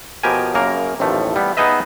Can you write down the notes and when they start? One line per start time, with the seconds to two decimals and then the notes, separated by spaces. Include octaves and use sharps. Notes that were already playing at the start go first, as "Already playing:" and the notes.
0.23 B2 F3 G4 A#4 G#5
0.54 F#2 C#3 A#3 A#4
1.00 A1 D#2 A2 F3 A3
1.36 G3 B3
1.57 B3 D#4 G#4 B4 D#5 E5